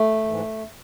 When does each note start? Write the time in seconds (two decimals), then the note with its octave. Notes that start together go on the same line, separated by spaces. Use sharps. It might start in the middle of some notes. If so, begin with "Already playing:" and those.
Already playing: A3
0.26 G#2 E3